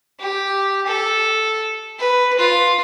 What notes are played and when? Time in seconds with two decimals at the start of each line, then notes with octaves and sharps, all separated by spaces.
0.20 G4
0.86 A4
1.98 B4
2.39 F4